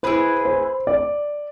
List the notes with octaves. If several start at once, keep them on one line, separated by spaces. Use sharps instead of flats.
E4 G#4 B4 C5
C5
D5